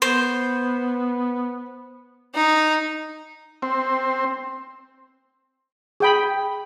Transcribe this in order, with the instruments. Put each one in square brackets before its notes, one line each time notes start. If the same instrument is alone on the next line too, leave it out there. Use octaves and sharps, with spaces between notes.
[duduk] B3 [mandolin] C5
[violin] D#4
[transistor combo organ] C4
[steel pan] G#4 G5 B5